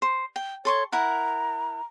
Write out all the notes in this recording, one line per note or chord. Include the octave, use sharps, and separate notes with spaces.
C5
G5
A4 C#5 C6 C#6
E4 A#4 F#5 A#5